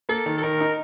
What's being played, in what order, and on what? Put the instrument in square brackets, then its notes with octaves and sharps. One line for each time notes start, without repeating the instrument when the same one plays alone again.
[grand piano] A#3 [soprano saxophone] A4
[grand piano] D#3
[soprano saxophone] A4
[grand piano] D#3 [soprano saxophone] A#4
[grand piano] D#4